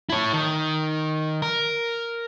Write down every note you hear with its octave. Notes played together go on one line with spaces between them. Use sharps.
E4 C#5
D#3
A#4